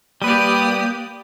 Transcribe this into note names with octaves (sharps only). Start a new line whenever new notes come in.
G3 A#3 G4 B4 D5 D#6